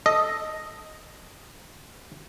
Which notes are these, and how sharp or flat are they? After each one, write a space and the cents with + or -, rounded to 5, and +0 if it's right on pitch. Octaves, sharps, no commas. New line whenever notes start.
A4 +0 D#5 +0